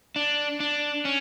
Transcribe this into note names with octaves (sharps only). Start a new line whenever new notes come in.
D4
D4
C#4